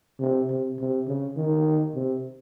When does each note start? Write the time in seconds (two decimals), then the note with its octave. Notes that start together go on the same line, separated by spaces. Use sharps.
0.20 C3
0.50 C3
0.79 C3
1.08 C#3
1.37 D#3
1.95 C3